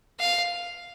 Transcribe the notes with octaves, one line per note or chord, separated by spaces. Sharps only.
F5